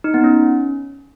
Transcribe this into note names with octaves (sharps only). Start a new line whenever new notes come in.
D#4
B3
C#4